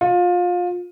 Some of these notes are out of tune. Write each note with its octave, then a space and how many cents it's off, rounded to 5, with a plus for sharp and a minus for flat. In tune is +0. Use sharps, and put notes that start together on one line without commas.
F4 +25